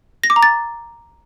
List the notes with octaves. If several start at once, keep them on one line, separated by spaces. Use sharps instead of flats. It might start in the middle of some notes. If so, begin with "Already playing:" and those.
A#6
D6
A#5
A6